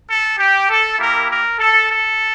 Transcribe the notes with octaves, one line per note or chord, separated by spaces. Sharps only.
A4
G4
A4
A#3 E4 G4 A#4
A#4
A4
A4